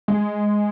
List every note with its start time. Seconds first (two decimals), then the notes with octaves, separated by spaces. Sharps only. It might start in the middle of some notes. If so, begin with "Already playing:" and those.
0.08 G#3